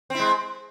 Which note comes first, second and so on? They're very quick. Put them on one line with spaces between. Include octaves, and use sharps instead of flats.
C4 E4 G#3